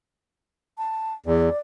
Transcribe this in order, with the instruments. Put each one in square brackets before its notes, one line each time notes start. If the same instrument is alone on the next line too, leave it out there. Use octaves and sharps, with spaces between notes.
[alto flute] A5
[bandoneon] E2 [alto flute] D5